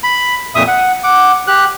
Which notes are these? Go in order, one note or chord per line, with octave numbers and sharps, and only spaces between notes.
B5
F2 A#2 E5 D#6
F#5
F#5 D6
G4 F#6